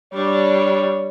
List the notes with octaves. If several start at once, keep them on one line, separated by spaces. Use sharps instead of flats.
G3 D4 C#5